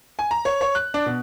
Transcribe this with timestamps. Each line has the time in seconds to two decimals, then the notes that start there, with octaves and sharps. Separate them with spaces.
0.19 G#5
0.31 A#5
0.45 C#5
0.61 C#5
0.75 F#6
0.94 D4
1.06 B2